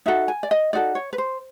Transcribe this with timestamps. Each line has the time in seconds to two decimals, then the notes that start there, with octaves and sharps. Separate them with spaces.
0.06 D#4 F#4 A4 E5
0.28 G#5
0.43 D5
0.51 D#5
0.73 D#4 F#4 A4 D5
0.95 C#5
1.13 B4
1.18 C5